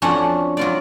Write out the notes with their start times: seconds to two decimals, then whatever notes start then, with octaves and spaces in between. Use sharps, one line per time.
0.02 F2 C#4 D4 F#4 F#5 C6
0.57 F#3 F4 D5